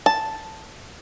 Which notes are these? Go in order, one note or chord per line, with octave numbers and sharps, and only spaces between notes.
A5